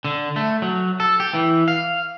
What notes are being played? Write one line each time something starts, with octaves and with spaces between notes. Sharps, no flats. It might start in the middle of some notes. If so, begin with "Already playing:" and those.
D3
A3
F#3
A4
G4
E3
F5